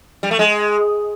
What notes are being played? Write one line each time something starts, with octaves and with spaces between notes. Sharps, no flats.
G3
A3
G#3